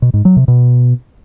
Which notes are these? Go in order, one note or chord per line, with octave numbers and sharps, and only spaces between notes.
B2
G#2
F#3
C3
B2